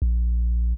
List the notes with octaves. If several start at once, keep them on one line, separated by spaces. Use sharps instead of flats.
A#1